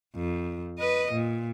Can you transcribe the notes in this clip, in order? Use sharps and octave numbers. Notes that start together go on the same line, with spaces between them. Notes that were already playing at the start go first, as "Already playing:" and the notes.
F2
B4 D#5
A#2